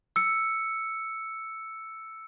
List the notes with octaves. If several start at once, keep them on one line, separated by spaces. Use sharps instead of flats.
E6 C#7